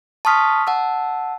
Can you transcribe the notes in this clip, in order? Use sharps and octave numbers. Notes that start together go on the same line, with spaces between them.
A5 C6 C#6 D#6 F6 B6
F#5 A5 E6